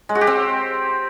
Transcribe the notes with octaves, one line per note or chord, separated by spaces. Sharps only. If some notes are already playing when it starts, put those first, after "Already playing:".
G#3
F#4
G4
C4